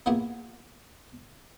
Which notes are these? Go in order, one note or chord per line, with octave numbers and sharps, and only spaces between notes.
A#3 B3 E4 F4 G4 G#4